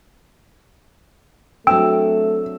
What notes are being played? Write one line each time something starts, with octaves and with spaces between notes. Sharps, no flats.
F#3 A3 C4 D4 G5 E6